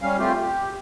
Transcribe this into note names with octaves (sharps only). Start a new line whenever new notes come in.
G3 C#4 F5
A3 C4 F4 G4
G4